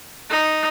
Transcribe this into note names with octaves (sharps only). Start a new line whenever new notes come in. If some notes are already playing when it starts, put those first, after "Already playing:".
D#4